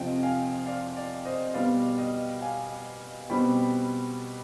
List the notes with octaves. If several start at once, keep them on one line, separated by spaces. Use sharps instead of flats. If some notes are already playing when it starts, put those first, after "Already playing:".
Already playing: F2 C3 F3 D#5 G5
F5 G#5
D5 F5
D5
C5 D#5
B2 G3 B3 D5 F5
D#5 G5
F5 G#5
B2 G3 C4 G5 B5